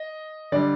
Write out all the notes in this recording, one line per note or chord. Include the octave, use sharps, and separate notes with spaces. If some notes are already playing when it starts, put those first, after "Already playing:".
Already playing: D#5
D3 G3 D5